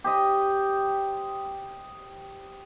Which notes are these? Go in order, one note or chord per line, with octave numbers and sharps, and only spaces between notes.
G4 C5 D#5